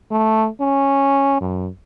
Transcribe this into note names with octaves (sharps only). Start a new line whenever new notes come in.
A3
C#4
F#2